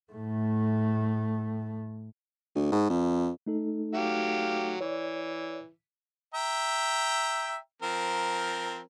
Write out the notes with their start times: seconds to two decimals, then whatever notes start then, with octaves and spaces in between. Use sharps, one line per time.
0.12 A2 A3
2.56 D2
2.72 G#2
2.90 F2
3.46 A3 D#4 A4
3.94 F#3 G4 F5
4.81 E3 C#5 D5
6.34 E5 G5 A#5
7.82 F3 C4 A#4